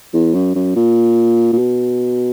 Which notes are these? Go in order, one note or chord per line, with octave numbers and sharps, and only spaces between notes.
E2
F#2
F#2
A#2
A#2
B2